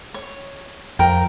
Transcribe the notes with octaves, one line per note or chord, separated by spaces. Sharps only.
C#5
F2 A#4 G5